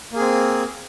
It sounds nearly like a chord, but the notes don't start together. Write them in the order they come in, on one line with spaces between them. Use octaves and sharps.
A#3 G#4 C4